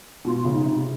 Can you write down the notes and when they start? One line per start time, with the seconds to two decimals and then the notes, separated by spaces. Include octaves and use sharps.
0.25 B2 F4
0.39 F4
0.45 C#3
0.53 D#4
0.65 C3